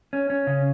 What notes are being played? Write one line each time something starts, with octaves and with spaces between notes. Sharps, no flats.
C#4
C#4
C#3